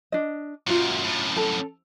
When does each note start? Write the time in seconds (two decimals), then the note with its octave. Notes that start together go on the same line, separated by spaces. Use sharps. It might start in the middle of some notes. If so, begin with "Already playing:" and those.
0.12 D4 D#5
0.67 F#2 A#2 F4 F#4
1.04 F#2 A2
1.37 A4